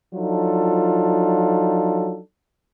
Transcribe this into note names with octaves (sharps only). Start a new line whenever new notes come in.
F3 F#3 D4 D#4 F4 A4